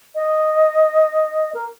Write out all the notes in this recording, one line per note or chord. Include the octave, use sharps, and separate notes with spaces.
D#5
A#4